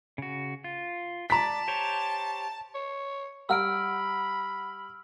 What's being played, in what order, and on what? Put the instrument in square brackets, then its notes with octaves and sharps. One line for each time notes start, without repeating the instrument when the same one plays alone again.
[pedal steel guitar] C#3 F#4
F4
[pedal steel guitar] D5 [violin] A5 [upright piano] A#5 B6
[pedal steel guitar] G4 C5 C#5
[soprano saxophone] C#5
[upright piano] G3 F#5 A#5 [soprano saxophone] B5 [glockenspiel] E6 F6 D7